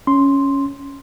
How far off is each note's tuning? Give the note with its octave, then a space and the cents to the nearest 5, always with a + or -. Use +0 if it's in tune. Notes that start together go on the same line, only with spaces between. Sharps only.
C#4 +0 C6 +0